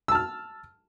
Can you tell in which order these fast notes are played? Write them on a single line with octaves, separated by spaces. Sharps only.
E6 A5 F6